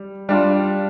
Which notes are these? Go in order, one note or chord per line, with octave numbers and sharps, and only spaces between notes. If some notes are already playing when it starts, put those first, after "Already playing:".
Already playing: G3
G3 D4 F4